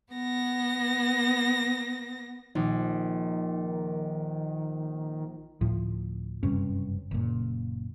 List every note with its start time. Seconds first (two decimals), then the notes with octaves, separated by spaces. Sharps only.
0.12 B3 A#6
2.55 A#1 D#3
5.61 D2 A2 F3
6.43 F#1 G2 C3 C#4
7.11 F#1 A#2